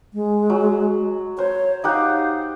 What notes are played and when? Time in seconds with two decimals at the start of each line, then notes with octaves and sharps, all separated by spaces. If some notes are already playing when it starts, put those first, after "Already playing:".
0.14 G#3
0.50 F#3
1.39 C5 C#5
1.84 D#4 G4 F5 F#5